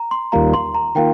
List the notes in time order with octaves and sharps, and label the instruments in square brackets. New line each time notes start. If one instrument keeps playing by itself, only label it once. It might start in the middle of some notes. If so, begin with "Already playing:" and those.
Already playing: [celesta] A#5
C6
[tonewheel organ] D#2 D#3 G3 A#3 F4 [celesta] A#5
[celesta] C6
A#5
[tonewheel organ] D#3 A#3 F4 [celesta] G5